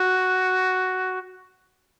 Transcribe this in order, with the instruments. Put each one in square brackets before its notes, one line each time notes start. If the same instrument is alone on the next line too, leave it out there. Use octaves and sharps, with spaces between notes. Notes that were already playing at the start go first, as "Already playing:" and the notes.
Already playing: [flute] F#4